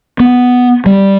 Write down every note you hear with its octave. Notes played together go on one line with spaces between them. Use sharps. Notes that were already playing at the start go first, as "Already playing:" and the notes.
B3
G3